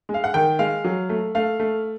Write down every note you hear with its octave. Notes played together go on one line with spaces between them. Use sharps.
G#3
F5
F#5
D#3 G5
G#3 F5
F#3
A3
A3 F5
A3